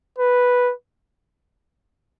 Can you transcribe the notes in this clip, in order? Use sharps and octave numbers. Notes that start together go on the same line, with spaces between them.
B4